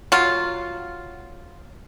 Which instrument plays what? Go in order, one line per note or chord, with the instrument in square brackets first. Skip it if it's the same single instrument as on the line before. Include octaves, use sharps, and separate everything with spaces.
[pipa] F#3 F4